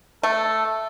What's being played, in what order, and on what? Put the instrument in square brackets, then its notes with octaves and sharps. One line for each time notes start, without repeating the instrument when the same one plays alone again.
[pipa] A3 [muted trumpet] A4